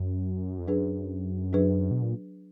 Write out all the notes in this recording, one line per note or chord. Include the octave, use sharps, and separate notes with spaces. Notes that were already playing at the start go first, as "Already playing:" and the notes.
Already playing: F#2
F2
F#2 F#3 D4 G#4 B4
F#3 D4 G#4 B4
B2
A#2